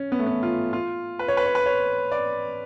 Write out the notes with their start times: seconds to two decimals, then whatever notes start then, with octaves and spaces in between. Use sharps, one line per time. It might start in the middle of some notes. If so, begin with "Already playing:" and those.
Already playing: C#4
0.12 B3
0.19 A3
0.26 B3
0.43 F4
0.73 F4
1.19 B4
1.28 C#5
1.37 B4
1.46 C#5
1.55 B4
1.66 C#5
2.12 D5